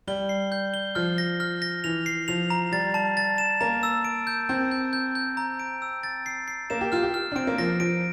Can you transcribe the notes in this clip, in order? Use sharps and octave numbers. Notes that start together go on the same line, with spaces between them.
G3 G7
C7
G6
G7
F3 F6
A#6
F6
A#6
E3 F7
C7
F3 F7
A#5
G3 A6
A5
A6
E7
A#3 A#5
E6
D7
G6
C4 G6
G6
G6
G6
A#5
D7
E6
A6
C7
C7
A#3 E7
G4
F4 F6
G4
F6
D4
C4 D7
A#3
F3 A#6
F3 D7